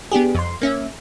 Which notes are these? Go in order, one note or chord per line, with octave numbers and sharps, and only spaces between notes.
B3 D4 G4 G#4
F2 C6
A#3 C#4 E5